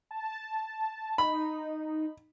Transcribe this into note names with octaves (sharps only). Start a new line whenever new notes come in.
A5
D#4 B5